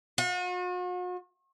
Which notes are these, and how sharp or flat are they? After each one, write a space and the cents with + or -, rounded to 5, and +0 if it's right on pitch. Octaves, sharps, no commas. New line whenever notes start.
F#4 -45